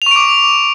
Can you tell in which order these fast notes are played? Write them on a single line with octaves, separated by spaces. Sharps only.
F7 C#6 D7 D6